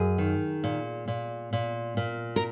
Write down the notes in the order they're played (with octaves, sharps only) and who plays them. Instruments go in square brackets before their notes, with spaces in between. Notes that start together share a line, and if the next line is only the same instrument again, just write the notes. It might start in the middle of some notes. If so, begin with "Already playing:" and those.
Already playing: [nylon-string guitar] F#2 G#4
D#3
A#2
A#2
A#2
A#2
A#4